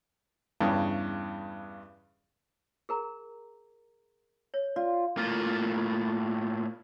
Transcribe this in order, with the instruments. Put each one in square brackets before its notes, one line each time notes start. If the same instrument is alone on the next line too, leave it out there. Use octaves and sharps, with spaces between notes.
[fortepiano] E2 G2 C#3
[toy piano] G#4 A#4 A#5
C#5
[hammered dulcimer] F4 [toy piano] D5
[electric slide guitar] A2 A#3 F4